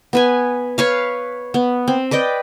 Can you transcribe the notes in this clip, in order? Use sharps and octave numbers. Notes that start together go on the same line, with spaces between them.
B3 B4 G#5
B4 C#5 F5
B3
C4
B4 D5 D#5 G5